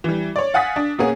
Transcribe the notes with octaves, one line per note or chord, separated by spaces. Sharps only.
E3 G3
C#5 D5
F5 F#5 G#5 D#6 A6 B6
D4
B2 A#3 B3 C#4 G#4